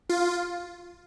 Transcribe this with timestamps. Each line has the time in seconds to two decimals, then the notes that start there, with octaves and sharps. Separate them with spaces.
0.09 F4